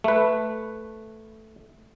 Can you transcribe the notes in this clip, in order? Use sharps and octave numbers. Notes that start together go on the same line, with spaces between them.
A3 B4